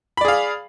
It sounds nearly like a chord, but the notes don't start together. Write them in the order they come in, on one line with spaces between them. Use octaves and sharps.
B5 D5 G#4 F5